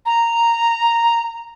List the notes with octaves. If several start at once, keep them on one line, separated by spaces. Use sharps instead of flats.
A#5